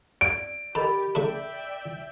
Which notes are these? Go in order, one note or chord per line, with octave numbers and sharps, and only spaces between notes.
D5 D7
G4 A4 A#4 D#5 B5
C#3 A3 A4 D5 E5 G5